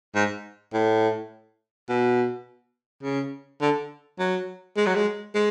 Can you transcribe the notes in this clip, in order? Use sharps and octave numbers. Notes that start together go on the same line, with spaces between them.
G#2
A2
B2
C#3
D3
F#3
G#3
F#3
G#3
G#3